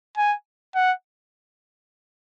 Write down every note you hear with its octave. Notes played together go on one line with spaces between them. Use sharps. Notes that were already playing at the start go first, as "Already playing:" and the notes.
G#5
F#5